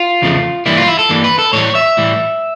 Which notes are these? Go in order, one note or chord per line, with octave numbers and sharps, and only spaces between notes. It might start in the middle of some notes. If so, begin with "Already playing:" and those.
Already playing: F4
E2 C#3 F3 A3
G2 E3 G3 A#3 E4
F4
E4
A4
G2 E3 G3 A#3
B4
A4
A2 E3 G3 C#5
E5
A2 E3 G3